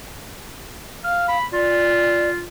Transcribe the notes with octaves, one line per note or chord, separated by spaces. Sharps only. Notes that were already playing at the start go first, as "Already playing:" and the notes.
F5 F6
B5
F4 D5